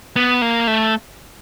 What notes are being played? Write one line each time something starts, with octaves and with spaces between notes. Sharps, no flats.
B3
A#3
A3